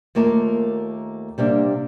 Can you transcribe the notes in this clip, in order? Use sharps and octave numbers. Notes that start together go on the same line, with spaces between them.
D#2 A3 A#3 F4 A5
C3 G3 A#3 D4